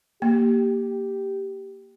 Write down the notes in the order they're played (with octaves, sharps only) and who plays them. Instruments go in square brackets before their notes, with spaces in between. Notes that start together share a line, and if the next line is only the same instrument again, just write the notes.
[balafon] A#3 [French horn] G4